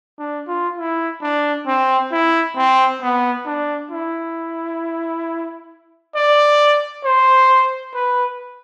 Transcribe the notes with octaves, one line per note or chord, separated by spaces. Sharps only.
D4
F4
E4
D4
C4
E4
C4
B3
D4
E4
D5
C5
B4